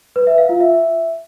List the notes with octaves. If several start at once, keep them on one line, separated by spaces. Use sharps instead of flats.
B4
E5
F5
F4
E5